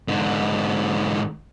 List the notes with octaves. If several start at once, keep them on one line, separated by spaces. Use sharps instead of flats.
G#2 D3